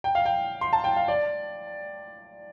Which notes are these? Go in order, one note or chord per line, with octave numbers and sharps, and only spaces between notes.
G5
F5
G5
C6
A5
G5
F5
D5